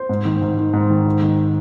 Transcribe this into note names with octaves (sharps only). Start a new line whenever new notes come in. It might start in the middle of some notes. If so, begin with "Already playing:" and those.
Already playing: C5
G#2
D#3
G#2
D#3
G#2
D#3
G#2
D#3